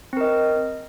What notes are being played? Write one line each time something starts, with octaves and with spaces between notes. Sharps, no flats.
C4 A#4 D#5